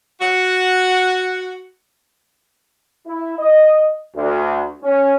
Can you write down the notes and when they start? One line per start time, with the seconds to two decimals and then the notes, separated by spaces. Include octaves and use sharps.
0.21 F#4 F#5
3.07 E4
3.38 D#5
4.15 D2
4.82 C#4